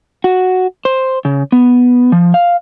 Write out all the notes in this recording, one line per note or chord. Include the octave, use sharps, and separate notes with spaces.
F#4
C5
C#3
B3
F3
F5